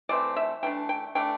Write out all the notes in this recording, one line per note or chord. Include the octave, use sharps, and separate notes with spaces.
E3 A3 C4 D5
E5
E3 A3 D4 G5
G5
E3 A3 D4 G5